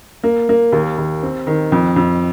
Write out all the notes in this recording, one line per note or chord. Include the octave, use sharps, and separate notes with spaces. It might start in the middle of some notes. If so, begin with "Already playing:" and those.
A#3
A#3
D#2
D#2
C4
D#3
F2
F2